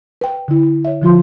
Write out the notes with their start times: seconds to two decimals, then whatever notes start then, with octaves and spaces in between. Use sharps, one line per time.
0.21 B4 G5
0.48 D3 E4
0.85 C#5 E5
1.02 D3 F3 F4 C6